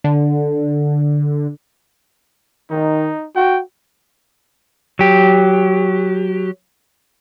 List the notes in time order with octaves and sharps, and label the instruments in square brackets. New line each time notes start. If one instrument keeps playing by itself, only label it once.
[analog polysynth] D3
[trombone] D#3 [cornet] D#4
[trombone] F#4 [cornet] G5
[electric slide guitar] F#3 G4